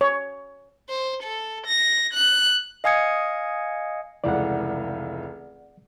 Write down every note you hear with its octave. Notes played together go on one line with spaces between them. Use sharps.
C#5
C5
A4
A#6
F#6
D#5 F5 G#5 D#6 G#6 C#7
F1 C#2 E3 D5 F#5